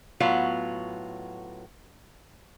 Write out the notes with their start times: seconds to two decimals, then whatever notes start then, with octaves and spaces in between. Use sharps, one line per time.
0.20 A2 F#3 B3 F4